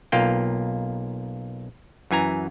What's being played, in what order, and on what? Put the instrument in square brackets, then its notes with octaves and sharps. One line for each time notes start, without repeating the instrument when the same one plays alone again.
[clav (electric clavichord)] B1 A#3 F4 G5
F#2 E3 G#5 A#5